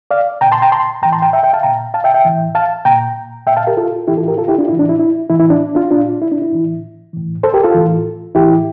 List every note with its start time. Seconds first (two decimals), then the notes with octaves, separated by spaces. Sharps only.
0.11 D5 F5
0.41 A#2 G5 A#5
0.52 A5 C6
0.62 G5 A#5
0.72 A5 C6
1.02 A2 E3 G5 A#5
1.12 A5 C6
1.22 G5 A#5
1.33 E5 G5
1.43 E5 G5
1.53 F5 A5
1.63 A#2 G5 A#5
1.94 F5 A5
2.04 E5 G5
2.14 E5 G5
2.25 A2 E3
2.55 F5 A5
2.85 A#2 G5 A#5
3.46 A#2 E5 G5
3.57 F5 A5
3.67 G4 A#4
3.77 F4 A4
4.08 E3 E4 G4
4.12 A2
4.17 F4 A4
4.28 G4 A#4
4.38 F4 A4
4.48 E4 G4
4.58 D4 F4
4.69 A2 E3 E4
4.79 D4
4.89 E4
5.00 E4
5.29 A2 E3 E4
5.40 E4
5.50 D4
5.75 D4 F4
5.91 A#2 D4 F4
6.22 E4
6.32 D4
6.42 E4
6.52 A2 E3
7.13 A2 E3
7.43 A4 C5
7.54 G4 A#4
7.63 F4 A4
7.74 A2 E3
8.35 A2 E3 E4 G4